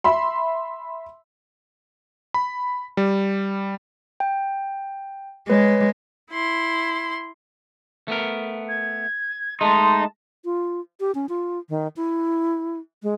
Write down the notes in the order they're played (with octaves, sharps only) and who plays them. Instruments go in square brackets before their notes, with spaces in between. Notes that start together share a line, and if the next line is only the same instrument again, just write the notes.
[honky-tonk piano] E5 B5 C6
[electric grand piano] B5
G3
[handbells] G5
[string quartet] G#3 [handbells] B4 C#5
[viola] E4 C6
[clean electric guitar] A3 B3 A#4
[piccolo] G#6
[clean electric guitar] G#3 A3 [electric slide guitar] D#4 [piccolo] A5 [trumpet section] C6
[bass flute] F4
G4
C#4
F4
D#3
E4
G#3